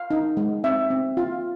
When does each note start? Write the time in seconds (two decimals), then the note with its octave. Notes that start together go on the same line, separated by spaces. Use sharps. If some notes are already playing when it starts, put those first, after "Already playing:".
Already playing: F5
0.11 D#4
0.37 G#3
0.64 C4 E5
0.90 C4
1.17 F4